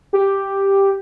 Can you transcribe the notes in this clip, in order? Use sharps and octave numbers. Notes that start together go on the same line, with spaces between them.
G4